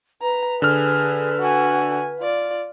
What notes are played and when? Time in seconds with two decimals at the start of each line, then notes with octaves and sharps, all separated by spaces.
0.22 B4 A#5
0.62 D3 G#4 F6
1.40 F#4 G#5
2.19 F4 D5